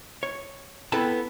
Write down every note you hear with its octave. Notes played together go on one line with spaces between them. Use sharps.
C#5
B3 C4 E4 A4 B4 A5